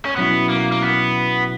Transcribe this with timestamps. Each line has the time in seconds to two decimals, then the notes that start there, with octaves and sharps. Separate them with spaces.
0.05 C#4
0.16 B1 B2 F#3 B3 C#4 E4
0.49 A#3
0.72 A#3
0.82 B3